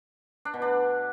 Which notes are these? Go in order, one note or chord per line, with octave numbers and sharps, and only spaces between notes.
D4
B2
D4